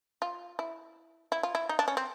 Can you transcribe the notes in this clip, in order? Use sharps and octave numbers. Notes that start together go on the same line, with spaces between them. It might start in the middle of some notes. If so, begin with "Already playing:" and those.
F4
E4
E4
F4
E4
D#4
D4
C#4
C4